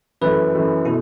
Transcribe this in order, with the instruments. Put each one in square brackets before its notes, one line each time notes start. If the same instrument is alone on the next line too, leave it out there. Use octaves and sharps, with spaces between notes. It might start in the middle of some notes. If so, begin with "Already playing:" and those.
[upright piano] F#2 E3 A3 [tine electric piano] B4
[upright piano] F#2 E3 A3
[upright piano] B2 A3 [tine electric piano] E4